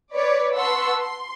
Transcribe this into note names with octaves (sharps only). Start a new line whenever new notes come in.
B4 C#5 D5
B4 F#5 A5 C6 C#6 E6
C6